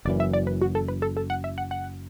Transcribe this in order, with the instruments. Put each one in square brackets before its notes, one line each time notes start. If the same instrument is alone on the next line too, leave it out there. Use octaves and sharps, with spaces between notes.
[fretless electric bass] F#1 F#2 E3 [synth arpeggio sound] D5
[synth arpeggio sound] E5
D5
B4
F#4
A4
B4
A4
A4
F#5
E5
F#5
F#5